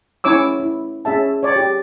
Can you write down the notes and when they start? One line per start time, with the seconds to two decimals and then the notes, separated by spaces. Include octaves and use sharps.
0.24 C#4 E4 C#5 D6 E6
0.60 E4
1.05 C#4 G#4 E5 A5
1.43 C#5 D5
1.56 G4